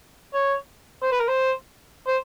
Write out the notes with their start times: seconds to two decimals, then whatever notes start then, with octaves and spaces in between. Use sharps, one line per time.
0.34 C#5
1.02 C5
1.12 B4
1.20 A#4
1.29 C5
2.07 C5